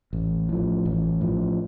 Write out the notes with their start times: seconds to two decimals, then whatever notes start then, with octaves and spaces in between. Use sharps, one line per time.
0.13 A1
0.49 A2 F3
0.86 A1
1.21 A2 F3